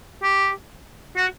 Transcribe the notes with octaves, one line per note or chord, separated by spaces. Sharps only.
G4
F#4